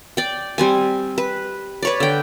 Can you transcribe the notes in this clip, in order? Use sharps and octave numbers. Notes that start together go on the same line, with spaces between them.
D5 G5
G3 C4 G#5
B4
B4 C#5 D5
D3 G5